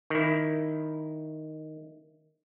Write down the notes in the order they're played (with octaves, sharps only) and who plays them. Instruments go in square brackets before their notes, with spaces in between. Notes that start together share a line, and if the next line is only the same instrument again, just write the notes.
[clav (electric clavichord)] D#3 E4